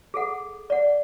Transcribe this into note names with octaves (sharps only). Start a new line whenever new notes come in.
G#4 A4 F#5
D5 F#5